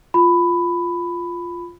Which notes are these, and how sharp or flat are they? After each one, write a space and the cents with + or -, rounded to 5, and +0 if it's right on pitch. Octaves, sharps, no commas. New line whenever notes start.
F4 +0 B5 +10